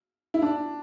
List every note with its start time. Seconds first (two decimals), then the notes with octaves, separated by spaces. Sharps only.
0.34 E4
0.42 D4